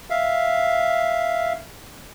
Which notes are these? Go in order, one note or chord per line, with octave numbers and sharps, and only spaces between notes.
E5 F5